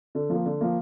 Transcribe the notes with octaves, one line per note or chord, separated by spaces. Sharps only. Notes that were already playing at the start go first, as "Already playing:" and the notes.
D3
F3 A#3
D3
F3 A#3